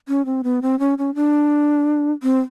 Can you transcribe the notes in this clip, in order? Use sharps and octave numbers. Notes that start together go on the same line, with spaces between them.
C#4
C4
B3
C4
C#4
C#4
D4
C4